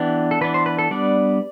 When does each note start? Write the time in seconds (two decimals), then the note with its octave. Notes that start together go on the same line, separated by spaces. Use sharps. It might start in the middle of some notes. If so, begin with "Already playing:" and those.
Already playing: E3 B3 D4 G4
0.31 A4
0.41 E3 B3 D4 B4
0.54 C5
0.66 B4
0.79 A4
0.91 G3 B3 D4 D5